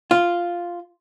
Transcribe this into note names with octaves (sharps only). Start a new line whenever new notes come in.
F4